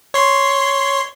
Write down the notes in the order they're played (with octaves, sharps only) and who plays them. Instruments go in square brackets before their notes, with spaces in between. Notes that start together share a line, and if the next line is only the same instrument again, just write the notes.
[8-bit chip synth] C#5 C6